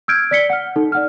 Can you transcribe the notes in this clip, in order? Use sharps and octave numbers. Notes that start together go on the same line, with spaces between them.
E6 F6 G6 G#6 D7
D5 B6 C#7 G7
F#5 F6
D#4 A4
D5 F#5 F6